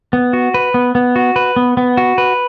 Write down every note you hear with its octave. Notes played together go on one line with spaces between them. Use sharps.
B3
F#4
B4
B3
B3
F#4
B4
B3
B3
F#4
B4